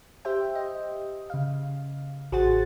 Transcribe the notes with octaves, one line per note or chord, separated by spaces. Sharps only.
G4 C5 E5 G5
D#5
C#3 F5
A1 F#4 G#4 C5 F#5 A6